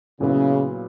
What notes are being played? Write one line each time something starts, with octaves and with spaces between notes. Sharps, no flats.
A#2 C#3 F#3 B3 E4